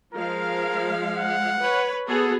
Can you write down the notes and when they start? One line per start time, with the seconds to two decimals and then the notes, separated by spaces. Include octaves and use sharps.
0.14 F3 G#3 A#4 F5
1.17 F#5
1.60 B4 C#5
2.08 B3 F#4 G#4 A4